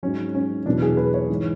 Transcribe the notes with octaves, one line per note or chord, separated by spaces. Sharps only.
G#2 F#3 C#4
C#4
E2 B2 F#3 D4
G#4
B4
C#5
G#2 E3